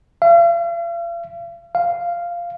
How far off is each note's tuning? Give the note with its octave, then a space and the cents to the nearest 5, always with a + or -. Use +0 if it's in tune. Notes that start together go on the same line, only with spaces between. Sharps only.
F5 -45
F5 -10